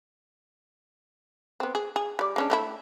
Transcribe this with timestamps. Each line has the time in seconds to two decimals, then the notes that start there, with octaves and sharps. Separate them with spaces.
1.60 B3 C4
1.75 G#4
1.96 G#4
2.19 G3 D5
2.36 G#3 C#4 D4
2.50 A3 C4 E4